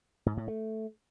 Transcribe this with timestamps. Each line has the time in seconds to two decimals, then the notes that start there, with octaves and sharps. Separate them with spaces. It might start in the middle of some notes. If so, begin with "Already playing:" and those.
0.26 G#2
0.37 A2
0.48 A3